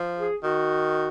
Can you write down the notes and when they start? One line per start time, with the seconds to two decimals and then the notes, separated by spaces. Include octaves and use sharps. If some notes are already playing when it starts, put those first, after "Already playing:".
Already playing: F3
0.18 G#4
0.43 D#3 F#4